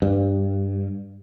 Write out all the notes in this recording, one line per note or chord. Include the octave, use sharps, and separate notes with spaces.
G2